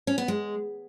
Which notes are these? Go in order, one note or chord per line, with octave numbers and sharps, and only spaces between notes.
C#4
B3
G#3